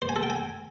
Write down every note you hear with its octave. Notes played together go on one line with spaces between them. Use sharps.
C5
G#5
A4
G5
G#5